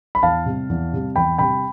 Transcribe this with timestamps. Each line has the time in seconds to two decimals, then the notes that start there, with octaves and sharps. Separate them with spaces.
0.15 B5
0.23 E2 F5 A5
0.46 C3 G3
0.70 E2
0.93 C3 G3
1.16 E2 G5 B5
1.38 C3 G3 G5 B5